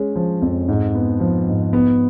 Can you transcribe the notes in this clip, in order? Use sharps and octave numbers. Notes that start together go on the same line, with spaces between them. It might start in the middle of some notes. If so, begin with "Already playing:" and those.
Already playing: G#3 C#4
F3
F2
G#2
B3
F3
G#2
B3